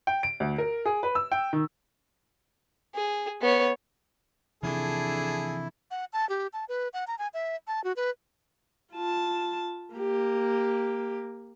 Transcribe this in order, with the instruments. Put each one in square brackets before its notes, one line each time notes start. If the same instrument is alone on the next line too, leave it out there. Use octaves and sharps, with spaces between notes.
[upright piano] G5
D7
D2
A#4
G#4
B4
E6
G5
D#3
[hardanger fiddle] G#4
B3 C#5
[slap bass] C3 E3 F3 [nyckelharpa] D4 A4 [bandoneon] E4 [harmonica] G#4
[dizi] F#5
A5
G4
A5
B4
F#5
A#5
G#5
E5
A5
F#4
B4
[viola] F4 A5
A#3 G4